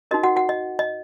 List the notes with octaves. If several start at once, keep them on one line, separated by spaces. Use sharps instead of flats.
D#4 F#4 A#4 D#5
F#4 F#5
F#4 F#5
D#5
D#5